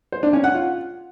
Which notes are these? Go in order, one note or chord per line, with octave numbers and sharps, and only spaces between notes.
C5
D4
C#4
F#5
F4